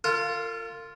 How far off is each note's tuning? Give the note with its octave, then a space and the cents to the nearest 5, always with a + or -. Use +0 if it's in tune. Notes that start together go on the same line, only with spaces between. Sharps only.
F4 +0 A#4 -45